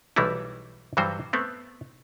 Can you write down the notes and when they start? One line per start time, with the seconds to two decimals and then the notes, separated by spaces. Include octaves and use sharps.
0.16 B1 E3 G3 A3 D#4 E4
0.97 G2 E3 F#3 G3 F#4 C5
1.33 A3 B3 C4